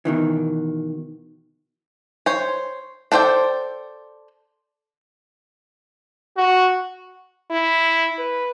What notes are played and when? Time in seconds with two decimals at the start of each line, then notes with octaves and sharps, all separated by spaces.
0.05 B2 D#3 E3
2.26 C5 C#5
3.12 D4 A4 C5 D5 G5
6.37 F#4
7.51 E4
8.18 B4